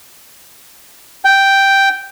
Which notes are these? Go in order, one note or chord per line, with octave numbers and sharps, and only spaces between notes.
G5